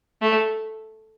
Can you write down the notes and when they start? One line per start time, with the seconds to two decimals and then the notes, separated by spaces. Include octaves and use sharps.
0.22 A3